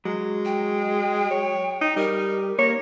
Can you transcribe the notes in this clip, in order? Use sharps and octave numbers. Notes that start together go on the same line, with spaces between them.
F#3 G#3
G5
C#5
D#4
G3 D#4 A#4
A#3 A#4 C#5